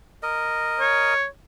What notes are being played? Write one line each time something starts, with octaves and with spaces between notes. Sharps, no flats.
A#4 D#5
C#5